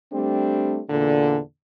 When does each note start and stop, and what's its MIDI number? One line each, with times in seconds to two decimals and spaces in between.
0.12 0.80 55
0.12 0.80 57
0.12 0.80 60
0.12 0.80 62
0.89 1.37 40
0.89 1.37 46
0.89 1.37 50